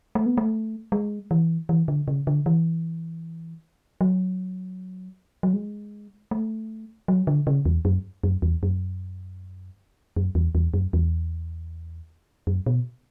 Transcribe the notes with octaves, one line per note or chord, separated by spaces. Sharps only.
A3
B3
A3
G#3
E3
E3
D3
C#3
D3
E3
F#3
F#3
G#3
A3
F#3
D3
C#3
E2
F#2
F#2
E2
F#2
F#2
E2
E2
F#2
E2
F#2
B2